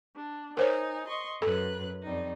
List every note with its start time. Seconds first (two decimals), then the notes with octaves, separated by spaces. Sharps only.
0.15 D4
0.57 D#4 A#4 C5 C#5 G#5
1.07 D#5 C6 C#6
1.42 F#2 A4 B4 F#6
2.03 F2 G3 D#4